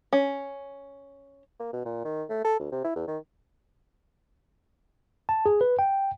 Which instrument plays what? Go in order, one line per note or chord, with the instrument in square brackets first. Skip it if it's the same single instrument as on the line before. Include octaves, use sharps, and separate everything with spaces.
[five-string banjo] C#4
[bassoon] A#3
B2
A#2
D#3
A3
A4
D2
C3
E4
E2
D#3
[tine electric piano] A5
G#4
B4
G5